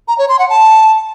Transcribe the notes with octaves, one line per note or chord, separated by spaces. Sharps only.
A#5
C#5
C6
F#5
A5